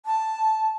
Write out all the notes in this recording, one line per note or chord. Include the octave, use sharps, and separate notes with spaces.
A5